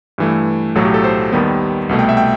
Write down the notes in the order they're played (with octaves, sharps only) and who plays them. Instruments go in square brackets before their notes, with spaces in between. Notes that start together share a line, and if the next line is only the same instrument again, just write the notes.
[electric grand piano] G2 E3 A3
B1 A2 F#3 A4
G4
A4
C5
D#2 D#3 G3 B3
C2 B2 A3
G5
E5
G5